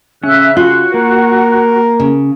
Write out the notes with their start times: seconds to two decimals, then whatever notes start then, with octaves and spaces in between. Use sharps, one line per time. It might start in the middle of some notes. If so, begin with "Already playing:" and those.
0.24 C#3 C#4 E5 E6 F#6
0.57 F4 F#4 C6 F#6
0.94 A#3 A#4
2.00 C#3